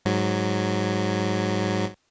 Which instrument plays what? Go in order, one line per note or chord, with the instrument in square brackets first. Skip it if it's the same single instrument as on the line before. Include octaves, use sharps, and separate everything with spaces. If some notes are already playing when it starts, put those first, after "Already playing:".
[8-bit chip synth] G#2 F#3